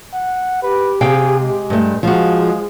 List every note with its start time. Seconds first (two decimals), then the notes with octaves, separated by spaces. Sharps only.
0.13 F#5
0.62 G4 B4
1.01 C3 G#4 F5 G5
1.40 G#3
1.70 G2 A3
2.03 F3 G#3 F#4 F5